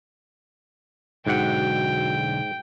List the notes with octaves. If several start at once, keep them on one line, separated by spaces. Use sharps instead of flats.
B1 G#2 D3 F#4 F#5 G5